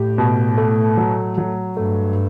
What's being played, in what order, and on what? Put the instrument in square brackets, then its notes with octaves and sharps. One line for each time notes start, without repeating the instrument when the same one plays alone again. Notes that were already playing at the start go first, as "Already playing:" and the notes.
Already playing: [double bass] A2 [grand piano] G4
[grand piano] B2
A3
F#3
F#3
[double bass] G2 [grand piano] A3